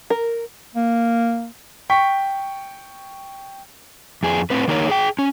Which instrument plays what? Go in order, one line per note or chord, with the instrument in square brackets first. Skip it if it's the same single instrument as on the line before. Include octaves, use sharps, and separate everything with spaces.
[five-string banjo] A#4
[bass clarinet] A#3
[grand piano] G5 C#6 B6
[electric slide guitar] F2 G#4
A2 C4 B4
D#3 A#3 D#4 A#4 B4 C#5
G#4 G5
C#4